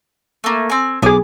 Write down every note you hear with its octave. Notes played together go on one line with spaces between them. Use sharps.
A3 A#3
C4 G#5
B1 B3 G#4 D6